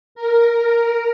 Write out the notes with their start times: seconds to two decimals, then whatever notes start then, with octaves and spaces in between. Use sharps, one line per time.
0.15 A#4